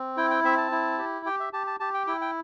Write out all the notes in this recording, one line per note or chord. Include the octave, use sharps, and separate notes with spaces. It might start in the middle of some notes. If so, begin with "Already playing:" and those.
Already playing: C4
E4 G5
G5
C4 E5
A5
E4
G4
G4 G5
E5
G4 A5
A5
G4 A5
G5
E4 G5
G5